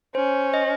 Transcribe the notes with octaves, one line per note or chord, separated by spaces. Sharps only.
C#4 C5
D#5